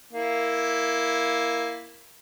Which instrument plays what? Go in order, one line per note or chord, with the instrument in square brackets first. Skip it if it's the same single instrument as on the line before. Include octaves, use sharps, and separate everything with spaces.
[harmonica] A#3 E4